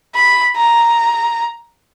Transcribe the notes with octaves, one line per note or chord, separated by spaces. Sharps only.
B5
A#5